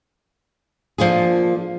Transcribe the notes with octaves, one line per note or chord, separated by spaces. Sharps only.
F3 A#3 D4 F4 G#4